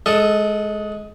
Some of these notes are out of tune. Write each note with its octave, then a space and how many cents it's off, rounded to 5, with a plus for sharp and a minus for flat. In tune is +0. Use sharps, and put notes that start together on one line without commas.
G#3 +20 A4 +0 D#5 +0